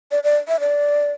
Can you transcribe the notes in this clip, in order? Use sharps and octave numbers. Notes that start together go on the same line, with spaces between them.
D5
D5
E5
D5